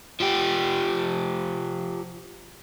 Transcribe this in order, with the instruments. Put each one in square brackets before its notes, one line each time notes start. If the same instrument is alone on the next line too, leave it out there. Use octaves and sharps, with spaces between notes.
[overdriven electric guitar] F3 G4